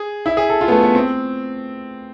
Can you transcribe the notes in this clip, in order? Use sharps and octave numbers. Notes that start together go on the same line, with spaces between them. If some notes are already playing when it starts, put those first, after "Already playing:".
Already playing: G#4
E4
G#4
A4
F4
B3
A3
B3
C4